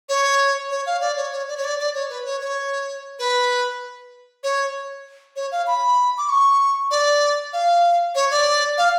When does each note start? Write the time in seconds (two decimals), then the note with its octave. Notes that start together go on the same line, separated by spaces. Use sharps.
0.09 C#5
0.71 C#5
0.86 F5
1.01 D5
1.17 C#5
1.32 C#5
1.48 D5
1.57 C#5
1.64 D5
1.79 D5
1.94 C#5
2.10 B4
2.25 C#5
2.41 C#5
3.19 B4
4.43 C#5
5.36 C#5
5.52 F5
5.67 B5
6.18 D6
6.29 C#6
6.91 D5
7.53 F5
8.15 C#5
8.31 D5
8.78 F5